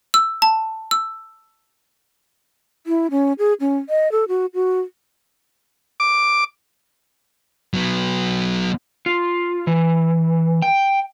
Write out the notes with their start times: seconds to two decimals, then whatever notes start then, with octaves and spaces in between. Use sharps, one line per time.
0.14 E6
0.42 A5
0.91 E6
2.87 E4
3.11 C#4
3.39 G#4
3.60 C#4
3.89 D#5
4.12 A4
4.28 F#4
4.54 F#4
6.00 D6
7.74 F#3 B3
9.06 F4
9.67 E3
10.62 G5